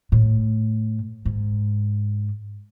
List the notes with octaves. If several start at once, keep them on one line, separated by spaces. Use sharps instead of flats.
A2
G#2